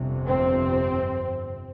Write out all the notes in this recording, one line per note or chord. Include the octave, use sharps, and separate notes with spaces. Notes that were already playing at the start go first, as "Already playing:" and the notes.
Already playing: G1 F2 C3
C4